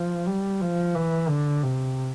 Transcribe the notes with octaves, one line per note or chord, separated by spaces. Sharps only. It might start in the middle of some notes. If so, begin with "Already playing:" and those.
Already playing: F3
G3
F3
E3
D3
C3